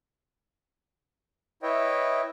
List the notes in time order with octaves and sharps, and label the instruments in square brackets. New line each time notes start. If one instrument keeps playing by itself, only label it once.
[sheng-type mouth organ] E4 B4 C#5 D#5 E5 G5